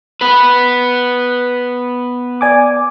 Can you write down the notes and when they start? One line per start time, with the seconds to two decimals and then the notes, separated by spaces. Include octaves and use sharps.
0.21 B3 B4
2.41 D5 G#5 D6